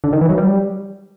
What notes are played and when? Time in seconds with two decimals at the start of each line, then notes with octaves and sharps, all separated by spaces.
0.04 D3
0.13 D#3
0.21 E3
0.29 F#3
0.38 G3